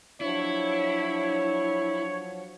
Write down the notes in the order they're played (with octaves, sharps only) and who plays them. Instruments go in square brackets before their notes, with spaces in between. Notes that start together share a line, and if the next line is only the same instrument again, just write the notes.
[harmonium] F3 F#3 [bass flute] D4 [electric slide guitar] E4 [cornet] C#5